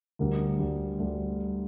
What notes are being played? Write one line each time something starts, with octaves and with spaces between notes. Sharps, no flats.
D2 D3 G3 A#4
D2 D3 G3
D2 D3 G3